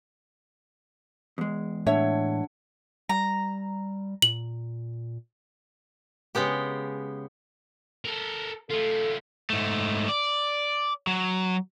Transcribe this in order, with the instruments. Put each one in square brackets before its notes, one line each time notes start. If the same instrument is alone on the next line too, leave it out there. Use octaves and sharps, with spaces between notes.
[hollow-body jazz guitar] E2 G#3
[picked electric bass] A2 [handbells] D4 F#5 [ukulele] C#5 E5
[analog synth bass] G3 [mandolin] A#5
[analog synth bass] A#2 [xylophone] F#7
[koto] C#3 G#3 B3 G4
[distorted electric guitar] A4 A#4
[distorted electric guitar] A3 F4 [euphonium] A4
[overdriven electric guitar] G#2 A3
D5
F#3